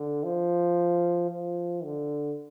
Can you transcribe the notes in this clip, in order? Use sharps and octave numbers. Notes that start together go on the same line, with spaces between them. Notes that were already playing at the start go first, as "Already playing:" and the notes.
Already playing: D3
F3
F3
D3